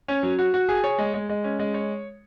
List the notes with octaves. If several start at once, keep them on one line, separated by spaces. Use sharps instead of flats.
C#4
F#3
F#4
F#4
G#4
C#5
G#3
G#3
G#3
C#4
G#3
C#5